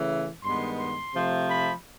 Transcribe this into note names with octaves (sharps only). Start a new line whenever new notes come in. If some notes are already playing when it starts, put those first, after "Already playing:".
Already playing: C#3 E3 A3
G2 D#3 G#3 B3 C6
C6
C3 F3 A3
B5